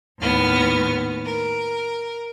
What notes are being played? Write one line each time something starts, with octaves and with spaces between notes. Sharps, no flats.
D#2 A2 B3 F6
A#4